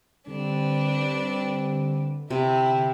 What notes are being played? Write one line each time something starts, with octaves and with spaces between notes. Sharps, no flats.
D3 G3 C4 D4 B4
C3 E4